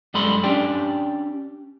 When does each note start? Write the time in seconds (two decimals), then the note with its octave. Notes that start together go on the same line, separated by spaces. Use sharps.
0.14 F#2 G3 G#3 A4 B5 C6
0.44 C#4 D4 G4 D5 G5